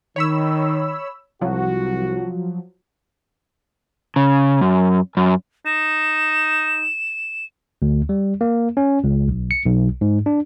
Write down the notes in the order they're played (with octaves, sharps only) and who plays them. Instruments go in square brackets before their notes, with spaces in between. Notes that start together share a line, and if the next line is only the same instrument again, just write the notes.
[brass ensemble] D#3 [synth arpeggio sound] C#5 B5 E6
[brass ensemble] C2 F#4 [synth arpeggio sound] F3 F#3
[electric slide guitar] C#3
F#2
F#2
[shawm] D#4 [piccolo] E7
[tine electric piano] D2
G3
A#3
C#4
C#2
B1
C#7
B1
G#2
D4